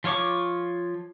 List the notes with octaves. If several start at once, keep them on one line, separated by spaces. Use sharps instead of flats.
F3 F4 C#5 C#6 D6